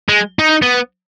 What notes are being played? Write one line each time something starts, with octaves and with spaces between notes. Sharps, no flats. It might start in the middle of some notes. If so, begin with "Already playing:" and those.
G#3
D#4
B3